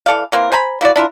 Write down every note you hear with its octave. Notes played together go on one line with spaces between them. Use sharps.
E3 A4 D5 F5
E3 A#3 C4 A#4
C5 G#5 A#5 B5
A#3 E4 F#4 D5
D4 E4 F4 A#4